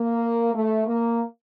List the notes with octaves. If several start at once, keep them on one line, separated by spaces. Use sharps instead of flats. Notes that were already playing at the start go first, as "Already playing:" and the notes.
Already playing: A#3
A3
A#3